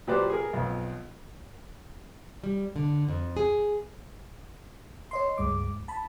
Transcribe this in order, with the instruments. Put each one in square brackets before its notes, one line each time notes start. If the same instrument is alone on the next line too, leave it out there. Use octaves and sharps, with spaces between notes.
[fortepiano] A#2 F#3 G4 B4 C5 D5
G#4 A#4
B1 F2
[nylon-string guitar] G3
D3
F2
G#4
[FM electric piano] C#5 D#5 C6
C#2 G2 G#3 D6
A5 B5